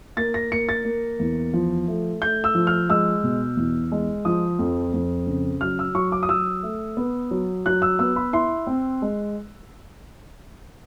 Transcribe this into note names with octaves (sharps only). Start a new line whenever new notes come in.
A#3 A6
A#6
A#3 C#7
A6
A#3
E2
F3
A3
A3 G6
E6
F3
F6
G#3 E6
B2
E2
G#3
F3 D#6
F2
F2
C#3
F#3 F6
E6
F#3 C#6
D6
D#6
F#3 E6
A3
B3
F#3
F#3 F#6
E6
B3 E6
B5
E4 C6
C4
G#3